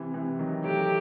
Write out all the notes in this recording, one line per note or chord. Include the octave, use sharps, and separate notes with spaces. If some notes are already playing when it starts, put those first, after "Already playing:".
Already playing: C3 E3
C3 E3
D#3 F#3
F#3 A3 G4